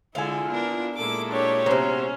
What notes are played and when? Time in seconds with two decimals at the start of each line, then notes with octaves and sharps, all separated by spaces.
0.15 D3 G#3 E4 F4 A4 F5 G#5
0.50 B3 D4 A#4
0.97 A#2 G#3 E4 A4 A#4 D6
1.29 D4 G4 C#5
1.66 C3 F#3 B3 C#4 C5